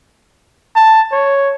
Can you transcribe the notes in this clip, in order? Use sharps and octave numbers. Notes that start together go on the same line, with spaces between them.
A5
C#5